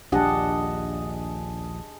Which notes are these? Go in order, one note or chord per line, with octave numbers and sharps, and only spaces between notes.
A#1 D#2 D4 G4 G#4 D#5 F#5 A5